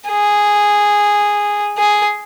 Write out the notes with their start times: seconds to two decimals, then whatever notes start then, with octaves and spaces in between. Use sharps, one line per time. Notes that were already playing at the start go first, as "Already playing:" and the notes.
0.09 G#4
1.78 G#4